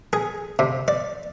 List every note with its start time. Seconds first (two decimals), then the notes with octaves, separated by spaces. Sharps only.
0.13 G#4
0.59 C3
0.88 D5